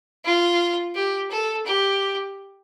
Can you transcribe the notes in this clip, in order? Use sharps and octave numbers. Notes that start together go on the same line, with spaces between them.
F4
G4
A4
G4